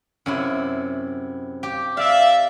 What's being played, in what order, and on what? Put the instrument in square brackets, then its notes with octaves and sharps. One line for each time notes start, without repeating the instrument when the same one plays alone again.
[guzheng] F#2 C3 E4
G4
[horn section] D5 E5 [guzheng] F5